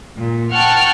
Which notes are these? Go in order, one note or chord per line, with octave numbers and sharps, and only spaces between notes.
A#2
F#5 G5 A5 C#6 F6